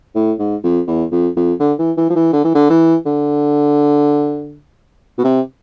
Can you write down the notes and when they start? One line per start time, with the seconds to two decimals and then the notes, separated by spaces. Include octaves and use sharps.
0.15 A2
0.39 G#2
0.63 F2
0.87 E2
1.11 F2
1.36 F2
1.60 D3
1.79 E3
1.97 E3
2.10 F3
2.15 E3
2.33 D3
2.44 E3
2.54 D3
2.70 E3
3.06 D3
5.18 B2
5.24 C3